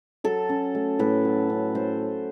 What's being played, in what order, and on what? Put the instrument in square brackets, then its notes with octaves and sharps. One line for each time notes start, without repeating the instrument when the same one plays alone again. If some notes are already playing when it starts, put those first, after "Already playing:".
[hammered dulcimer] F#3 A4
C#4
A3
A2 B4
F#3
C#4
A3 C5